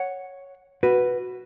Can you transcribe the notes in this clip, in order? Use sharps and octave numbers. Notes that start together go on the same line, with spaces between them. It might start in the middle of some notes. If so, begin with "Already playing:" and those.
Already playing: C#5 F#5
F#4 B4